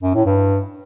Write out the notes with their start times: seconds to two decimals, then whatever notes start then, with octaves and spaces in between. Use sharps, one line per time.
0.03 F#2
0.14 A2
0.26 G2